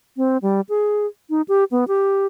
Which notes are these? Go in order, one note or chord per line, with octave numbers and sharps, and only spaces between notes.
C4
G3
G#4
D#4
G4
B3
G4